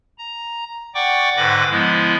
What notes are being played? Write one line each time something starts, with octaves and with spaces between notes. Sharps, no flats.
A#5
D5 F#5 G5 C#6 D6
G#2 D3 B4 B5 D6 A#6
F3 G#3 B3 E4